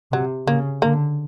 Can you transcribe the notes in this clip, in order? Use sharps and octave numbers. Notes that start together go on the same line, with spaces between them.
C3 F#3
C#3 A#3
D3 A#3